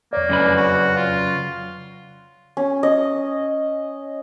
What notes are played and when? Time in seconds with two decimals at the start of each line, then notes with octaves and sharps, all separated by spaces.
0.13 F2 A#3 C#5 D5
0.29 F#2 C#3 B4
0.57 F#4
0.97 F4
2.57 C#4
2.83 D#5